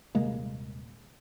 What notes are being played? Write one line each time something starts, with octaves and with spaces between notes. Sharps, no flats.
D#1 C3 G#3 A#3